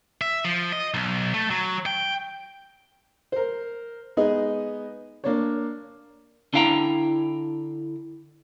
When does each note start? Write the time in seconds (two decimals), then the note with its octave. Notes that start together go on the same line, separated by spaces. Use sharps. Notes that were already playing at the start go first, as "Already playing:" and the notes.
0.21 E5
0.45 F3
0.72 D#5
0.94 B1
1.34 A3
1.50 F#3
1.86 G5
3.32 A#4 C5
4.17 G#3 B3 D#4 G#4 D#5
5.24 A#3 D4 C#5
6.53 D3 D4 E4 F5 G5 A#5